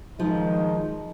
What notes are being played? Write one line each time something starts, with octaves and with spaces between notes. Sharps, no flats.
D#3 F3 G#3 D#4